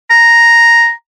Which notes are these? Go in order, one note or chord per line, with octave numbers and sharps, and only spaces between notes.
A#5